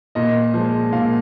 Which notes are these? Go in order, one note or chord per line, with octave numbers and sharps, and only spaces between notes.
A#2 D#5
F3 G#3
A#2 F5